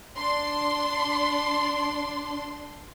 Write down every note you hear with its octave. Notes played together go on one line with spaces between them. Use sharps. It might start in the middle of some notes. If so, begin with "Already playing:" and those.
D4 C6